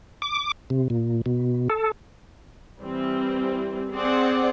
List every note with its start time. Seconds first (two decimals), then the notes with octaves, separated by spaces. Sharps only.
0.22 D6
0.70 C3
0.90 A#2
1.26 B2
1.70 A4
2.80 E3 G3 C4
3.92 C4 G#4 C5 D5 F#5